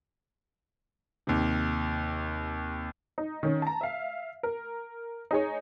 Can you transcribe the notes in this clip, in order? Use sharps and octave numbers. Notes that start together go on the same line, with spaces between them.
D#2 C3
D#4
D#3 C#4
A5 A#5
E5 F5
A#4
D#4 G#4 C#5